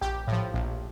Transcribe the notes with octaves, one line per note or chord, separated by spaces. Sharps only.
A#1 G4
A2 F3
A#1